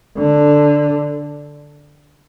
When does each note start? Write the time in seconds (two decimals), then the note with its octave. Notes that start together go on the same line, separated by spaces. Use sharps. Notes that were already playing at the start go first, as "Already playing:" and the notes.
0.18 D3